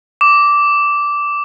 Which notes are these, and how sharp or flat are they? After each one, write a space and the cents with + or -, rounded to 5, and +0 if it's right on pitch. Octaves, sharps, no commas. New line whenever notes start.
D6 -10